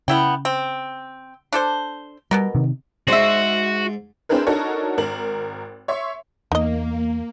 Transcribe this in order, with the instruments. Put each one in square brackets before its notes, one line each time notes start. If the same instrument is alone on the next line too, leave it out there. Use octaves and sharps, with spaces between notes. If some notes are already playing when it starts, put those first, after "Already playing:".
[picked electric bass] C#3 [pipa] B3 E4 G5
[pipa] C4
D4 A4 C5
[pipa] B2 B3 A#4 [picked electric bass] G3
[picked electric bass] C3 D#3
[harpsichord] G#2 [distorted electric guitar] F#4 [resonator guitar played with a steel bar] C5 E5
[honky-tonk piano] C4 D4 E4 G#4 A#4 B4
D4 D#4 F#4 A4 A#4 C#5
G#1 A#4 F#7
C#5 E5 C6 C#6
[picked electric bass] E2 [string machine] A#3 [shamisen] D#4 D#5